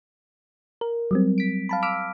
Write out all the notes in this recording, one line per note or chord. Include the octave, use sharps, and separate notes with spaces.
A#4
F#3 G3 C4
B6 D7
F5 A5 B5
D6 E6 F6 B6 D7